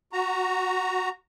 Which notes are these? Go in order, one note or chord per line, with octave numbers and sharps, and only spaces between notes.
F#4 A#5